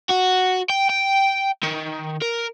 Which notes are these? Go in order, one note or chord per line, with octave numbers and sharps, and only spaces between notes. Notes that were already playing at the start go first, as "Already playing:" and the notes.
F#4
G5
G5
D#3
A#4